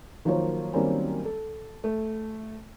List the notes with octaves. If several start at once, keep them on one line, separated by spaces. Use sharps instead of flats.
D#3 F3 F#3 A#3 C5 C#5
D#3 F#3 G3 A#3 C4 C#4
A4
A3